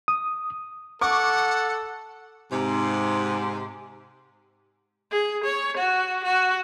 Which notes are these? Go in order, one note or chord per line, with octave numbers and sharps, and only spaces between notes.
D#6
A4 F#5 C#6 D6
G#2 C3
G#4
C#5
F#4
F#4